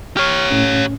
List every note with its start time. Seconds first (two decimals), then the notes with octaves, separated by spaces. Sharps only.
0.17 G4 C#5 F6
0.51 A2 C#4